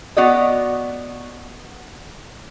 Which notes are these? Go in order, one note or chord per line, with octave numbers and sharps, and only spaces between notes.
B3 F#4 D5 D#5